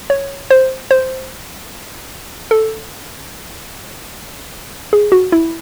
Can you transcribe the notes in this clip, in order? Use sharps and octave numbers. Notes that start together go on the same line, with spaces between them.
C#5
C5
C5
A4
G#4
F#4
E4